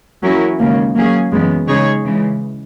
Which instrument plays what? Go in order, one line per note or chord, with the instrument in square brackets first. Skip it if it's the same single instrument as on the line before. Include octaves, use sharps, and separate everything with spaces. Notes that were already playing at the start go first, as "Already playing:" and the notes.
[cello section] E3 A#3 C#4 E4 A#4 [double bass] F#3
[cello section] D#2 C#3 E3 G#3 C#4 [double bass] A#3
[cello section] F#3 C#4 G#4 [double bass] A#3
[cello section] F#2 C#3 E3 B3 [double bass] G#3
[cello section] C#3 G#3 D#4 G#4 C#5
C#3 E3 G#3